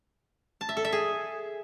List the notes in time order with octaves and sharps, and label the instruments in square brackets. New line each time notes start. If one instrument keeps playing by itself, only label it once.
[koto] A5
E5
A4
E5
G#4